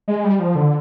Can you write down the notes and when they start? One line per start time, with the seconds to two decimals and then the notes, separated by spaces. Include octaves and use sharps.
0.08 G#3
0.24 G3
0.39 F3
0.55 D3